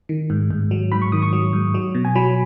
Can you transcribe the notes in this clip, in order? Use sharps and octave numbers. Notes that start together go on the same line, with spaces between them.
D#3
G#2
G#2
F#3
G#2 B5
C#6
D#3 D#6
C#6
F#3
G#2
F#3
B2
G#5
F#3 B5